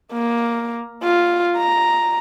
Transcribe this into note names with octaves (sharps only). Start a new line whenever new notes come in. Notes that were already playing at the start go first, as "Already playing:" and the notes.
A#3
F4
A#5